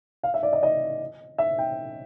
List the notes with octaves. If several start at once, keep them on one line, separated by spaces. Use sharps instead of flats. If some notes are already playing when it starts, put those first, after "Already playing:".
F5
E5
D5
D#5
D#5
E5
G5